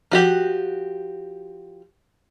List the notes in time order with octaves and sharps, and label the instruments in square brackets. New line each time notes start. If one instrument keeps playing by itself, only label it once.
[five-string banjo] F3 F#4 G4